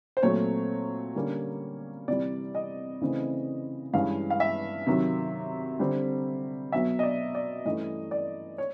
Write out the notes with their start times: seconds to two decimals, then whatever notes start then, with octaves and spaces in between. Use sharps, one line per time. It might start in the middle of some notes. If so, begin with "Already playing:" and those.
0.17 C5
0.23 A#2 F#3 A3 C4 C#5
1.15 D3 G3 A#3 C#4
2.08 C3 E3 G3 D5
2.55 D#5
3.01 C#3 E3 A3 C4
3.93 G2 E3 G#3 C#4 F5
4.30 F5
4.40 E5
4.86 C3 D#3 F#3
5.79 D3 G3 C4
6.72 B2 F#3 B3 E5
6.99 D#5
7.03 D5
7.35 D5
7.65 G2 E3 A3 C#4 D#5
8.11 D5
8.58 C#5